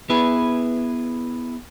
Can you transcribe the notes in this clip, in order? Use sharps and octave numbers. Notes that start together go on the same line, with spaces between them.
B3 E4 G#4 B4